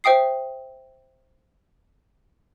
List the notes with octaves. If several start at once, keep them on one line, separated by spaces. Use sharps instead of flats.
C5 E5 G5 D#6 C7